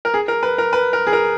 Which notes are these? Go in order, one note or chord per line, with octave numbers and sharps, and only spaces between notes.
A#4
G#4
A#4
B4
A#4
B4
A#4
G#4
A#4